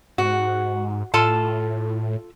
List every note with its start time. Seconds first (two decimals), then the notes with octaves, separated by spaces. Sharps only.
0.18 G#2 F#4
1.14 A2 F4 A4 A5